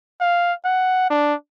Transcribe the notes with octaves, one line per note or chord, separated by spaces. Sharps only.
F5
F#5
D4